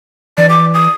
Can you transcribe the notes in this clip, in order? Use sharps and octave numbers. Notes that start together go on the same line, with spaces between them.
E3 D5
D6
D#6